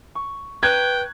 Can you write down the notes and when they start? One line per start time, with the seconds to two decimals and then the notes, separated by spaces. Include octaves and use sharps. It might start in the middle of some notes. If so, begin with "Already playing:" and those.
0.15 C#6
0.63 B4 G5 A#5 F#6 G#6